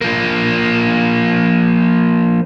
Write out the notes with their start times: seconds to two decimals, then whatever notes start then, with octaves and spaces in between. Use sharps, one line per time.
0.01 F3 A#3